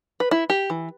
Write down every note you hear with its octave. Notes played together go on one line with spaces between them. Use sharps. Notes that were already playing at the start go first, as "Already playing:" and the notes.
B4
E4
G4
E3